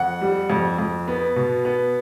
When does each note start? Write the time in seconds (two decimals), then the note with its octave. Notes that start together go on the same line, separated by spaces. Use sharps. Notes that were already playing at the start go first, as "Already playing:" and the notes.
Already playing: F2 F#5
0.21 G3
0.50 F2
0.79 F2
1.08 B3
1.36 B2
1.65 B3